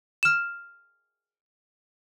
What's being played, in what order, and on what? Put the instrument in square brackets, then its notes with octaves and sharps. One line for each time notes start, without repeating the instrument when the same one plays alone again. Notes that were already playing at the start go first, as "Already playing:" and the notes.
[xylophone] F6 E7